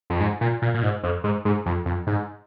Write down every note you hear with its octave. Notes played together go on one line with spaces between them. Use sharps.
F2
G#2
A#2
A#2
A#2
G#2
F2
G#2
G#2
F2
F2
G#2